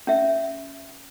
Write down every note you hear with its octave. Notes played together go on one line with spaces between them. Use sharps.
C#4 E5